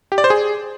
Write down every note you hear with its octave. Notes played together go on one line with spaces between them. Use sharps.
G4
D5
C5
G#4